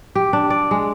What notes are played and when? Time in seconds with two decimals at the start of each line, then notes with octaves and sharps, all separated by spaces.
0.15 G4
0.33 D4
0.50 D5
0.71 G#3